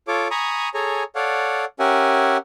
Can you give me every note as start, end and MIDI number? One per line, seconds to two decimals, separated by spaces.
0.08 0.28 65
0.08 0.28 69
0.08 0.28 73
0.08 0.28 86
0.31 0.69 80
0.31 0.69 82
0.31 0.69 83
0.31 0.69 85
0.31 0.69 87
0.74 1.03 68
0.74 1.03 69
0.74 1.03 73
0.74 1.03 80
0.74 1.03 82
1.15 1.65 69
1.15 1.65 73
1.15 1.65 74
1.15 1.65 77
1.15 1.65 78
1.80 2.37 61
1.80 2.37 67
1.80 2.37 70
1.80 2.37 76
1.80 2.37 78
1.80 2.37 80